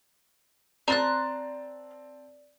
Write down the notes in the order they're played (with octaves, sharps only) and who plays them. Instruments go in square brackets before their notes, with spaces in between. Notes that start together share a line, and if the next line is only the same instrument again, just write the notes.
[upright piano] C4 A5 A6 [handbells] D5 [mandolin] A#5 C6 F#6